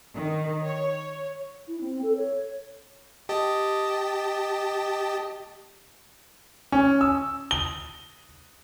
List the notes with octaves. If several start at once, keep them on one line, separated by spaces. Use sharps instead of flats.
D#3
C#5
E4
C4
A4
C#5
G4 D#5 A5
C#4
E6
G7